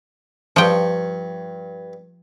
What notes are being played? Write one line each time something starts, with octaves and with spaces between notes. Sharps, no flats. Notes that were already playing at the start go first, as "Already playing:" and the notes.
G2 F3 G5 C#6